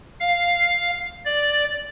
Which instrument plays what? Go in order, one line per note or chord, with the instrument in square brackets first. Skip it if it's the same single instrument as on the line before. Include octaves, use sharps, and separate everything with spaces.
[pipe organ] F5
D5